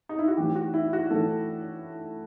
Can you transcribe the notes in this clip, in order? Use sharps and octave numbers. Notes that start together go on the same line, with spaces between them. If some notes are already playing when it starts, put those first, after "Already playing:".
D#4
E4
F#4
A2 E3 G4
F#4
E4
F#4
A2 E3 A4